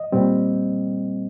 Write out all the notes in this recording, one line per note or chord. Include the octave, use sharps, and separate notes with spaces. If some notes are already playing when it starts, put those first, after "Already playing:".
Already playing: D#5
A#2 G3 C4